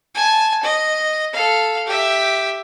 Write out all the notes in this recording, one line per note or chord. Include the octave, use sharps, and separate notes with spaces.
G#5 A5
D#5
A4 F5
G4 E5